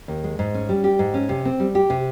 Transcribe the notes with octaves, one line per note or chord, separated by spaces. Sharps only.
D#2
G#3
G#2
C#4
G3
G4
G#2
C#4
C3
C4
G3
G4
C3